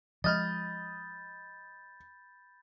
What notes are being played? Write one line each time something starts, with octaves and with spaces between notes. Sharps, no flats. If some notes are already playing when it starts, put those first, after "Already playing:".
F3 G#3 D#5 B5 F6 G6 A6